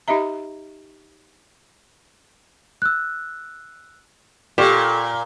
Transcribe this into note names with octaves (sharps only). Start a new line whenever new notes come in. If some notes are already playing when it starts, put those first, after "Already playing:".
D#4 G4 D#5 E5 A#5
E6 F#6
A#2 G4 A4 C#6 E7